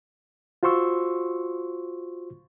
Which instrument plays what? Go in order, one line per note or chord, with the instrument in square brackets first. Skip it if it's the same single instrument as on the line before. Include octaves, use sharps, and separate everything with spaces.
[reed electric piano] F4 F#4 C5 C6 C#6 E6